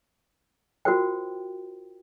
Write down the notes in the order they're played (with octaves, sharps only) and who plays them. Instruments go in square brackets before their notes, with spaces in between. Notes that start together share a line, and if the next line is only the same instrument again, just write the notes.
[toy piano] F4 F#4 A#4 C5 G5